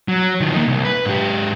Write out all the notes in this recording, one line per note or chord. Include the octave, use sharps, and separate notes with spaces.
F#3
D#3 F3
A#3 D#4
C2
B4
G#2 G4